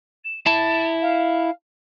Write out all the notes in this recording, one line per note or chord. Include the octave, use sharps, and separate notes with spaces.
E7
E4 A5 A6
F5